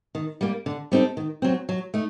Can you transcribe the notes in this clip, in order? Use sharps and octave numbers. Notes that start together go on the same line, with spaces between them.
D#3
G3 A#3
D3
G3 C4 D#4 A4
D#3
F#3 C4
F#3
A3 D#4